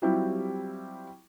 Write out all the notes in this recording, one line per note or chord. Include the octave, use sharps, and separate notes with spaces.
F#3 G3 C4 E4 F4 G4